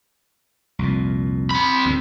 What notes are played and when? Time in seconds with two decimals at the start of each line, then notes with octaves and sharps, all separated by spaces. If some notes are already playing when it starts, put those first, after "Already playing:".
0.79 C2 F2 A#2
1.51 C4 B5
1.85 D2 G#2